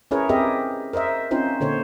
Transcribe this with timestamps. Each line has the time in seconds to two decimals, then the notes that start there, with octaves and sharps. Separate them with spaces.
0.11 C#4 E4 G#4 A#4 B4 C#5
0.29 C4 G4 G#4 A#4 D#5 E5
0.93 A#4 C5 D#5 E5
1.31 C4 C#4 D#4 F4 C5
1.60 A#2 D3 C5 C#5